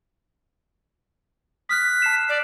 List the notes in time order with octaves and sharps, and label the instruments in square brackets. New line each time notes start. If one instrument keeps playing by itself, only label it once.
[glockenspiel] D#6 F6 F#6 [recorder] B6
[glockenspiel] A5 C7 E7
[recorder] D5